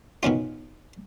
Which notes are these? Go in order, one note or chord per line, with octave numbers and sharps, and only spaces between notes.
B2 D#3 C#4 F4